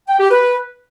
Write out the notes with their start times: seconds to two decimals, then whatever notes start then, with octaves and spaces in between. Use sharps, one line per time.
0.08 G5
0.19 G4
0.31 B4